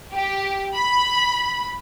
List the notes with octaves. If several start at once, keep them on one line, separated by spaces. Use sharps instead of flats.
G4
B5